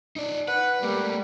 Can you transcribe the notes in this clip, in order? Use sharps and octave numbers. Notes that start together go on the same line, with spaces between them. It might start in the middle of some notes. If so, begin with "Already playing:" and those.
D#4 D5
B4 F#5
G3 A3 A#3